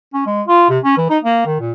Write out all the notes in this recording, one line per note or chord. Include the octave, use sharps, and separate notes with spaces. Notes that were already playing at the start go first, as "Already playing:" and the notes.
C#4
G#3
F4
C3
C#4
E3
D#4
A#3
D#3
A#2